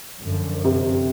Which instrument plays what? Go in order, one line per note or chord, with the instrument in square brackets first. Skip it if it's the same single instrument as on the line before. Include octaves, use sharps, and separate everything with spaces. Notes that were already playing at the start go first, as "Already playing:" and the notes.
[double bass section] F#2 D3 F3
[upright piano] C3